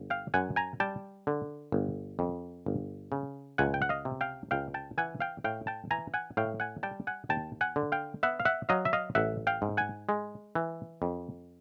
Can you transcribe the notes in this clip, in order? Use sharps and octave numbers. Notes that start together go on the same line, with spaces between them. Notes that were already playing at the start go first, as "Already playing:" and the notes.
Already playing: G1
F5 G5
F#2 F#5 G#5
G#5 A#5
G3 G5 A5
D3
G1
F2
G1
C#3
C#2 F#5 G#5
G5
F#5
D#5 F5
C3
F5 G5
C#2 F5 G5
G5 A5
E3 F#5 G#5
F5 G5
A2 F5 G5
G5 A5
E3 G#5 A#5
F#5 G#5
A2 F5 G5
F#5 G#5
G3 G5 A5
F#5 G#5
D#2 G5 A5
F#5 G#5
D3
F5 G5
B3 E5 F#5
F5
E5 F#5
F#3 D#5 F5
E5
D#5 F5
A1 E5 F#5
F5 G5
G#2
F#5 G#5
G#3
E3
F2